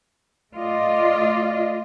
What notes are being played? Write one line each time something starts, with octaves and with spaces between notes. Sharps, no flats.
A3 F4 D5 D#5